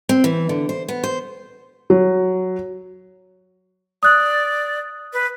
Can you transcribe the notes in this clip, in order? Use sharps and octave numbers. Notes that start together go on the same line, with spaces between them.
C4
E3
D3
C5
B3
C5
F#3
D5 D#6 F#6
B4